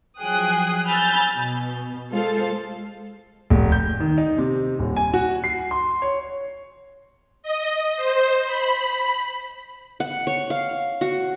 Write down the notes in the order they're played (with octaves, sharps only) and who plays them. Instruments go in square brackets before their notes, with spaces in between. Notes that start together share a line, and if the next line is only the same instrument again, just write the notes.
[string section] F3 F#3 G#4 G5 D#6 F#6
G#5 B5 E6 F6 G6 A6
B2
G#3 F4 A4 C5 F5
[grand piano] F1
G6
D#3
D#4
C3
D#1
G#5
F#4
C7
C6
C#5
[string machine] D#5
C5
B5
[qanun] F#5
C#5
F5
F#4